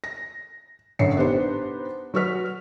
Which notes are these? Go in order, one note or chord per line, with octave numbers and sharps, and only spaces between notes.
A#6
A1 F#2 D3 C7 C#7
B3 D4 D#4 G4 B4 C5
F#3 F#4 B4 F6 B6